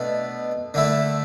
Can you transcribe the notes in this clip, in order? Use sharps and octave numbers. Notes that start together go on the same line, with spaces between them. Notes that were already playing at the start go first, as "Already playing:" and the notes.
Already playing: B2 A3 D4
D3 A3 E4